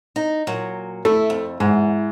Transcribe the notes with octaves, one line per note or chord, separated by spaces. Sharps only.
D#4
A#2 F#3
A3 E4
F2
E2 G#2